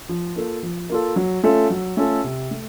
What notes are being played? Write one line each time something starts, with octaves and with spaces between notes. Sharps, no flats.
F3
A#3 F4 A4
F3
A#3 F4 A4
F#3
A3 C#4 F4 A4
F#3
A3 C#4 F4 A4
C3
A3